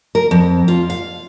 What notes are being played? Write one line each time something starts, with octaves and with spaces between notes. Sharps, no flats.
A#4
F2
F4
F5